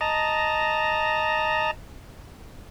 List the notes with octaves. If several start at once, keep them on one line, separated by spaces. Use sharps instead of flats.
D#5 A5 A#5